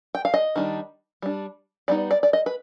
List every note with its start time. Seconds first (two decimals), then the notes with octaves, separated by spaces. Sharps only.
0.15 G5
0.25 F5
0.34 D#5
0.56 D#3 G3 D4
1.22 G3 D4
1.88 G3 B3 D#4 D5
2.11 D5
2.23 D5
2.33 D#5
2.46 B4